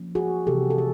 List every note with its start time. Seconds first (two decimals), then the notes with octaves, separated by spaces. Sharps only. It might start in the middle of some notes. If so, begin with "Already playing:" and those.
Already playing: F3 A#3 C#4
0.15 F#4 G#4
0.47 C3 E3 G3 G4 A4
0.70 A4
0.78 G#4